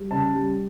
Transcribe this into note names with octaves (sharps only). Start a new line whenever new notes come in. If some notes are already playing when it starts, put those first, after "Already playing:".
Already playing: G3
C#3 A5
G3